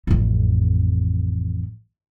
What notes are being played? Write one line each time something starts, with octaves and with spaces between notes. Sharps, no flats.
A1 F2